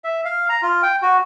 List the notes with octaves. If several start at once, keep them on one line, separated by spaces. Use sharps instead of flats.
E5
F5
A#5
F4
G5
F#4